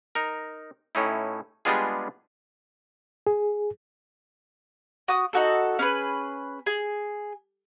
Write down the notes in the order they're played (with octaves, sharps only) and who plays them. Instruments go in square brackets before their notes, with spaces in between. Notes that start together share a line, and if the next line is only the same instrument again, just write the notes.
[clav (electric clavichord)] D#4 A#4
A2 C#4 D#4 E4
G3 G#3 B3 D4 F4 G#4
[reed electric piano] G#4
[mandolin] F#4 D#6
D#4 F#4 A4
C#4 G#4 A#4 B4
G#4